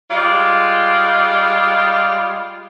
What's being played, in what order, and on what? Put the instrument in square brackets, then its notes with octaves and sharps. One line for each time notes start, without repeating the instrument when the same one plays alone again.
[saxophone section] G3 G#3 F4